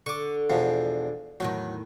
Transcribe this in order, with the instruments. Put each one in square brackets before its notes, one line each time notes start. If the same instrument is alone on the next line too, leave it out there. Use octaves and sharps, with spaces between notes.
[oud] D3 [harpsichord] C#6 D6
[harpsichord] E2 B2 F3
[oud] E2 A2 D#3 [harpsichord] F#3